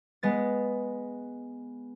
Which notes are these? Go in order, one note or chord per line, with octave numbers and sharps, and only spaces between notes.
G#3 B3 A6